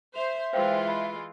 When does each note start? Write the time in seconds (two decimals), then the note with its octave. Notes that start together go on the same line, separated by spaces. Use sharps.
0.15 C5 E5 F7
0.53 E3 G#3 F4 C5 F5 G5
0.88 B5